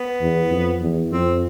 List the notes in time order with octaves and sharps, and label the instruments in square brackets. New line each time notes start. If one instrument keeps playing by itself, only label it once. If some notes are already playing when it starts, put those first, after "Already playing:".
Already playing: [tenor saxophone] B3
[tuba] E2
F2
E2
[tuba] F2 [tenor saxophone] C4